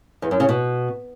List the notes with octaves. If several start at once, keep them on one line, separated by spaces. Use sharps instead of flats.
E2
F#2
C#3
B2